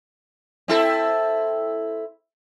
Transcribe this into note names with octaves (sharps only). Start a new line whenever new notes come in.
C4 E4 A4